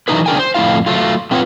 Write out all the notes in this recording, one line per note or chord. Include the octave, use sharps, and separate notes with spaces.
E3 F#3 D4 D#4 G#4 B4
C#3 D4 G#4 A#4 G5 G#5
C5
F2 A2 B3 E4 F4 F5
F#3 A3 F4
A3 C4 F4 B4 C#5 F#5